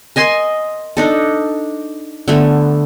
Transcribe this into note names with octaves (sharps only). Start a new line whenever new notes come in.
A#4 D#5 G#5 C6
D4 D#4 A4
D3 A3 B3